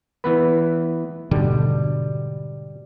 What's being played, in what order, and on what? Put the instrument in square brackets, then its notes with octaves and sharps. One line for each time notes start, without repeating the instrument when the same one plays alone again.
[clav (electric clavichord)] E3 B3 B4
[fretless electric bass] G#2 B2 D3 [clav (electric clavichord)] G3